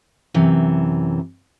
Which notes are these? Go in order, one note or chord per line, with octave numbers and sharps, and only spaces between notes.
F#2 C3 E3